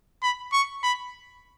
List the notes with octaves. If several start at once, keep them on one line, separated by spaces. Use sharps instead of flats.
B5
C#6
B5